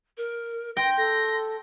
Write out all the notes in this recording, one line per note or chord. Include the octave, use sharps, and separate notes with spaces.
A#4
G5 C6 A#6
A4 A#6